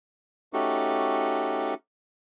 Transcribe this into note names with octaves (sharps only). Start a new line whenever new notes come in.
A3 C#4 D#4 F#4 G4 A4